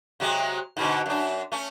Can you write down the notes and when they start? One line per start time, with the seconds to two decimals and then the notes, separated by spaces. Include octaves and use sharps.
0.20 C3 F#3 G#3
0.77 G#2 B2 D3
1.06 F#2 D4
1.52 A3 C#4